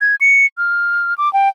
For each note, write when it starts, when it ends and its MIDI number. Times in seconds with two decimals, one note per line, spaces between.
0.01 0.15 92
0.21 0.46 97
0.58 1.14 89
1.18 1.32 86
1.33 1.49 79